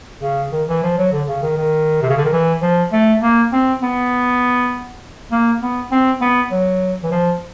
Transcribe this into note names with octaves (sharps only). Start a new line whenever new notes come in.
C#3
D#3
E3
F3
F#3
D3
C#3
D#3
D#3
C3
C#3
D3
D#3
E3
F3
A3
A#3
C4
B3
A#3
B3
C4
B3
F#3
E3
F3